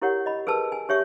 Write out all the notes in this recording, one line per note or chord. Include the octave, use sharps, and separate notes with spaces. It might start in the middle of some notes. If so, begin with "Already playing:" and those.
E4 G4 A#4 C#5 F#5
D#5 B5
G#4 A#4 B4 A5 E6
G#5
G4 C#5 E5 C#6